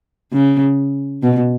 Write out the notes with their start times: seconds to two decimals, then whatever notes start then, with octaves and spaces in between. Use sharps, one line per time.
0.33 C#3
1.23 B2